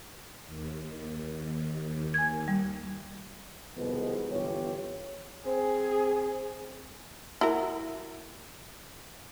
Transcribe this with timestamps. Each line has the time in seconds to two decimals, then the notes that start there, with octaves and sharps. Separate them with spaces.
0.47 D#2
2.14 G#5 G#6
2.48 G3
3.76 C2 F2 B2 D#3 G#3 B3
4.30 G1 E2 F4 G4 C#5
5.46 C4 G#4
7.41 E4 F#4 A#4